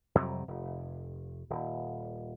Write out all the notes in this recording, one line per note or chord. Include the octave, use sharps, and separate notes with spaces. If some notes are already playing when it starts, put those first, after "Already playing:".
F2 C3 F#3 G3
F1
D#1